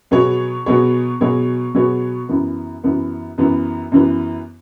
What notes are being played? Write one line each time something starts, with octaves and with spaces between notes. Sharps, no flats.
B2 F#3 B3 G#4 C#5
B2 F#3 B3 G#4 C#5
B2 F#3 B3 G#4 C#5
B2 F#3 B3 G#4 C#5
F#2 E3 B3
F#2 E3 B3
F#2 E3 B3
F#2 E3 B3